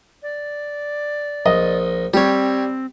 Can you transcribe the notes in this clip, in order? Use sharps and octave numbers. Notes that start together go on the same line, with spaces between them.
D5
A#1 D#5
G3 C4 G4 C#5